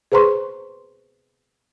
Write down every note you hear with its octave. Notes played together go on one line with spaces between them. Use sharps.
G#4 B4 C5 A#5 C6 C#6